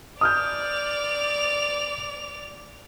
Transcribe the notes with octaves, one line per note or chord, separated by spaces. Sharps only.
D5 D#6 F6 G6 F7